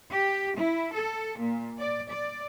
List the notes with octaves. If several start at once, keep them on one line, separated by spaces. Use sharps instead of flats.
G4
E4
A4
A#2
D5
D5